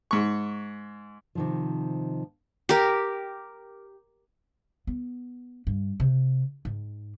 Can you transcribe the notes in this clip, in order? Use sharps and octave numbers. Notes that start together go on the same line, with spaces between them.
G#2 C#6
C3 D#3 F3
G4 A#4
B3
G2
C3
G#2